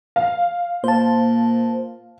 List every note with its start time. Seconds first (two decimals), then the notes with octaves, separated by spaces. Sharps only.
0.16 F5
0.84 A#2 C5 A5